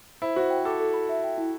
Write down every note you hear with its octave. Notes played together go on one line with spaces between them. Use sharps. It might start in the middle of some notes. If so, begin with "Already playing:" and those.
E4 C5
F#4 C5
G5
A4 D6
A4
B5
E5
G5
E4